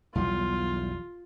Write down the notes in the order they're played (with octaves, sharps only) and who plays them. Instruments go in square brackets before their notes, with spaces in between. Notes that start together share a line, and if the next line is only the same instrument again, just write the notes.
[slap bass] B1 E2 G3 [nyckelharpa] F4